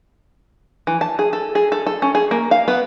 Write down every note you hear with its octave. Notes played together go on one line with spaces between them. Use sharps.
E3
A5
G#4
A4
G#4
A4
A4
C#4
G#4
A#3
F5
B3